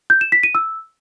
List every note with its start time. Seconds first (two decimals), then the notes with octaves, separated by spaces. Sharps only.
0.10 G6
0.21 E7
0.32 B6
0.43 D#7
0.55 E6